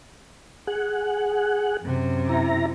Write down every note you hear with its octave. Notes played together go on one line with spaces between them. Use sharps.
G#4 F#5
F#2 C3
E4 A#5